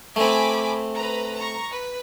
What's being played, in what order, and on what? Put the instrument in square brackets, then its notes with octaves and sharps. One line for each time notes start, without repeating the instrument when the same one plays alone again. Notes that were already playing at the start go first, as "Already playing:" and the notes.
[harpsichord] A3 C4 [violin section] G#5 B5 D6
[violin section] B4 A#5
A#5 C#6
B4